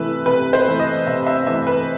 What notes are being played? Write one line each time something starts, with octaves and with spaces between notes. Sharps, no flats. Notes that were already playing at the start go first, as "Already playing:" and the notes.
Already playing: C3 E3 A3 E4 B4 E5
C3 B4
C5
E3 A3 E4
D#5
C3 E5
E5
E3 A3 E4 E5
B4